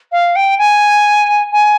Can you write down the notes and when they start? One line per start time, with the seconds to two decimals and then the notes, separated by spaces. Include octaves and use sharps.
0.12 F5
0.36 G5
0.58 G#5
1.52 G#5